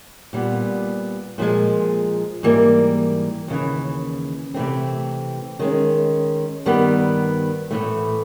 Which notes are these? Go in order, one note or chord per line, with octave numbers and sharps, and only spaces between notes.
A#2 G3 B3
A#2 F3 G#3
G#2 E3 G3 A#3
D#2 C#3 E3
C3 E3 A3 C4
D#3 G#3 C#4
G2 D#3 G3 B3
A2 E3 A3